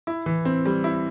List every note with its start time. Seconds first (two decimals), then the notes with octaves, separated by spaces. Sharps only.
0.07 E4
0.26 E3
0.45 C4
0.65 G3
0.84 E4